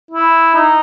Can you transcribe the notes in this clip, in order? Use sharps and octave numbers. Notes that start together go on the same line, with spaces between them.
E4
D#4